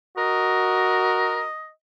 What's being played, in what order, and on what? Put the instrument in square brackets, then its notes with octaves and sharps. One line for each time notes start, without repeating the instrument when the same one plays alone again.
[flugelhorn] F#4 [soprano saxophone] A#4 [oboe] D#5